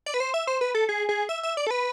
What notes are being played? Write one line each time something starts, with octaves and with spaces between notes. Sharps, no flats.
D5
B4
C5
E5
C5
B4
A4
G#4
G#4
E5
E5
D5
A4
B4